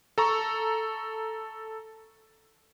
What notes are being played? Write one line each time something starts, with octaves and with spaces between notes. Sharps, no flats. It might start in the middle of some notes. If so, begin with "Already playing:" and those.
A4 A#5 C#6